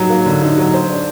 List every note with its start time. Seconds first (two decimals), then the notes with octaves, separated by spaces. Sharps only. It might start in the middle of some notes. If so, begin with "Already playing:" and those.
Already playing: F#3 D#4
0.10 A#3
0.26 D3
0.42 D#4
0.58 F#3
0.74 C5
0.89 D4